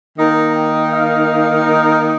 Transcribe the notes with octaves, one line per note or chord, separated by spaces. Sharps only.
D#3 A#3 D#4 A#5
G5
F5
A#4